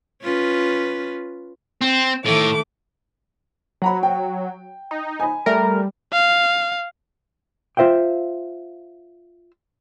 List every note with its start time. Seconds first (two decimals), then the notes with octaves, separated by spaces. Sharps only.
0.23 C#4 F4 B4
1.81 C4
2.26 A2 D#3 A3 D6
3.82 F#3 F#5 A#5 B5
4.03 G5
4.91 D#4
5.20 G#5 B5
5.46 G3 A3 A#4
6.13 F5
7.77 F4 C5 E5 F5 G5